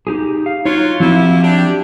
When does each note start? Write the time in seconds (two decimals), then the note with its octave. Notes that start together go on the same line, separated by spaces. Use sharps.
0.07 D#4 G4 G#4
0.46 F5
0.65 F#3 D#4 F4 C#5
1.00 F3 G3 A#3 C4 E4 F#4
1.43 D4 G4